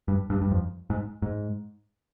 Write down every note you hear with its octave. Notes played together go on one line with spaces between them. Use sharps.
G2
G2
G2
F2
G#2
G#2